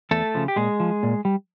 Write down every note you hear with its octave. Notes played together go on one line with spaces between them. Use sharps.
E2 A3 A4
C#3 F3
G4
A#2 G#3 G#4
F3
A#2
G3